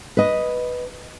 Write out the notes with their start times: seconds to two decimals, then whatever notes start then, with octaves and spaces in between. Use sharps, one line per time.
0.17 B4 D#5